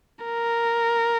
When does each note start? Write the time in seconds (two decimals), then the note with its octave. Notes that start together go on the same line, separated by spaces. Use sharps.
0.25 A#4